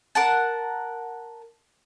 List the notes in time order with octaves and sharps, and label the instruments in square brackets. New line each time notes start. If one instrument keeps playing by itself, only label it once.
[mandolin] A#4 F#5 A5